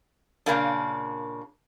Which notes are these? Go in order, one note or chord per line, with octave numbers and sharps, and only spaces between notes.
A#2 C#3 A#3 D4